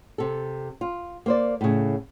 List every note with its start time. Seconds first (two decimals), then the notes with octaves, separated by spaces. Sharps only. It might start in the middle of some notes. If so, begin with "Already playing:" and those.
0.18 C3 A4
0.81 F4
1.26 A#3 C5 D5
1.61 A2 C#3